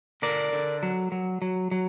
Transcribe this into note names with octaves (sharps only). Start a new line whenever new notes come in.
D3 A#4 D5
D3
F#3
F#3
F#3
F#3